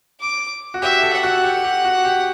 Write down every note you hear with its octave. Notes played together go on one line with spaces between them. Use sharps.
D6
F#4
G4 E5
A4
F#5
F#4
G4
G4
F#4
G4